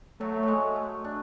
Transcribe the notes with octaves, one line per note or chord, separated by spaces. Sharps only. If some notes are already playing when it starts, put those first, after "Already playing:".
F#3 A3
F#3
G#3
A3
D4